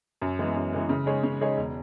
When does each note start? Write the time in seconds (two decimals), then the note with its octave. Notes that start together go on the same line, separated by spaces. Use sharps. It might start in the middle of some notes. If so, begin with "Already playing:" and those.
0.22 F#2
0.39 E3 G#3 B3
0.56 F#2
0.73 E3 G#3 B3
0.89 C#3
1.06 G#3 D#4 G#4 C#5
1.23 C#3
1.41 G#3 D#4 G#4 C#5
1.57 E1